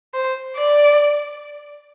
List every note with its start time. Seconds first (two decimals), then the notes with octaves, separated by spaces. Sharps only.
0.14 C5
0.57 D5